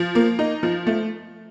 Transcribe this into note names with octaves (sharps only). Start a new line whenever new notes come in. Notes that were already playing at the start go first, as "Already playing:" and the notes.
Already playing: F3
A#3
D#4
F3
A3